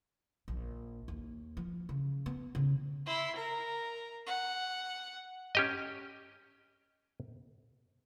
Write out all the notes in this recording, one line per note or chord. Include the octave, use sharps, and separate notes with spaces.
A#1
D#2
F3
C#3
B3
C#3
E4 C6
A#4
F#5
C#4 G4 D#5